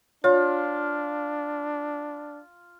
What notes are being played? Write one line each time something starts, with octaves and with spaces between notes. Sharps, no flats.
D4 F4 C#5